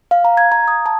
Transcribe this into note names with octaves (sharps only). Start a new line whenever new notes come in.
F5
A#5
G#6
A#5
D#6
A5